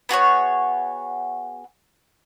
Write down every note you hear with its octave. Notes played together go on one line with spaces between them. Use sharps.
B3 F#4 G#4 C#5